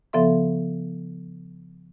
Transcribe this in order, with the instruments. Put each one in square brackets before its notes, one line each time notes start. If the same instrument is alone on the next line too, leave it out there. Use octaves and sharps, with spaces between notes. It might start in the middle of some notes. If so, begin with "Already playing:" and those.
[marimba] C#3 F3 B3 A4 E5 C6